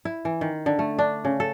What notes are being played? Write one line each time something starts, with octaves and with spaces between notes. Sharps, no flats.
E4
E3
D#3
D3
A3
D4
C#3
A4